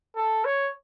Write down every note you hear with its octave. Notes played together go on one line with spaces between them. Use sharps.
A4
C#5